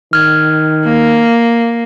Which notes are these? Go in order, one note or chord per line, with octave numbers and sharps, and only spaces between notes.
D#3 F6 G#6
A#3